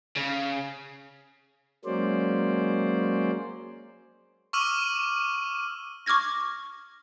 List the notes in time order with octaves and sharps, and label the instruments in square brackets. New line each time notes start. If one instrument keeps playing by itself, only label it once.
[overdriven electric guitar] C#3
[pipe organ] F#3 G#3 A#3 C#4 C5 D5
[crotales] C#6 D6 E6 F6 D#7
[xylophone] C#6 D6 F6 G#6 A#6